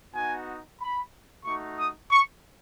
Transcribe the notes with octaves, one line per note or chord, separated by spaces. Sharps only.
B3 D#4 F#4 G#5
B5
A3 D#4 F#4 C#6
D#6
C#6